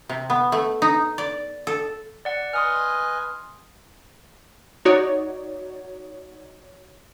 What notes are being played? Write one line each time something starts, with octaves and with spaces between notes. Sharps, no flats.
C3
B3
A3
D#4
D5
A4
D5 F#5
B4 D#5 G#5 C6 D#6 F6
D#4 F#4 C#5 D5